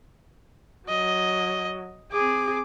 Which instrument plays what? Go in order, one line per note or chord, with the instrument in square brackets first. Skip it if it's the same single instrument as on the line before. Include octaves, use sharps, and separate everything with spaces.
[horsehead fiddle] F#3 [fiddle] D#5
[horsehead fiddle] C4 G#4 [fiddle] D6